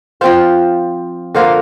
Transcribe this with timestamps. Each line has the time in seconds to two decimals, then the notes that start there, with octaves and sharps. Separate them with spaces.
0.21 F3 C4 F4 C5 F5
1.35 D3 A#3 F4 C5 F5